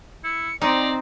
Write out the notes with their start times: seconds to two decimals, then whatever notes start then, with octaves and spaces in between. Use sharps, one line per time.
0.24 E4 C#7
0.62 C4 D#4 D5 A#5